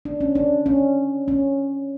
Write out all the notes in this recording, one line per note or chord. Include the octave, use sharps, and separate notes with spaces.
D4
C#4
D4
C#4
C#4